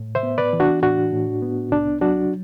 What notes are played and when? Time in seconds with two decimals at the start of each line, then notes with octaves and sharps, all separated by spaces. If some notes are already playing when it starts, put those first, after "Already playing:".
Already playing: A2
0.15 C5 E5
0.23 B3
0.38 B4 D5
0.53 E3
0.60 D4 F#4
0.83 A2 D4 F#4
1.13 A2
1.42 B3
1.72 C2 D4
2.01 F#3 D4 F#4